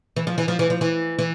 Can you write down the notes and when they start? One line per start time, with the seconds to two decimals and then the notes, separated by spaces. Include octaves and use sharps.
0.16 E3
0.27 F3
0.38 E3
0.48 F3
0.59 E3
0.70 F3
0.81 E3
1.19 E3